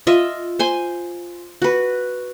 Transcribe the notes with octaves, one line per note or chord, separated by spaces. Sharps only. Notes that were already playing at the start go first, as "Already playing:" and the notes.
F4 D#5 E5
C5 G#5 C6
F#4 B4